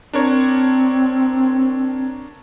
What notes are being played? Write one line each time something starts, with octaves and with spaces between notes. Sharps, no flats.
C4 D4 A#4 C#5